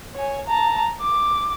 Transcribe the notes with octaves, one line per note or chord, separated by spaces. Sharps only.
C#5 G#5
A5 A#5
D6